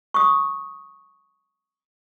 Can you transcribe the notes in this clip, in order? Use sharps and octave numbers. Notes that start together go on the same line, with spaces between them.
C#6 D#6